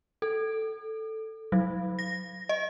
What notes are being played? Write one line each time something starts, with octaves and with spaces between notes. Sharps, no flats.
A4
F#3
A#6
D#5